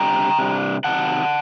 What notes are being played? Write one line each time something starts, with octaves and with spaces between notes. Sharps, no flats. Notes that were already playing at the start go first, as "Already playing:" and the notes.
Already playing: C3 G3 D4 G5 A#5
C3 G3 D4
C3 D#3 F#3 F#5 A5